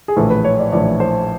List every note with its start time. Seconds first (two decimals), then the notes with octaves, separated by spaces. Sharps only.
0.08 G#4
0.16 A#1 A2 E3 A4
0.30 B4
0.44 C#5
0.59 D5
0.72 A#1 A2 E3 D5
1.00 C5